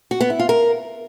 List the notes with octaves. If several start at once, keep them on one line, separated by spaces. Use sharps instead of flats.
F#4
B3
E4
F4
A#4